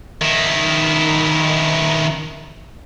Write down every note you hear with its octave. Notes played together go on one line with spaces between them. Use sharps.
D#3 E4